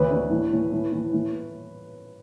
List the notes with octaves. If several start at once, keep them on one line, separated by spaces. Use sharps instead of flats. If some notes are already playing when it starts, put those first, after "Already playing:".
Already playing: D2 B4 C#5
D4
A2
A2
A2
A2
A2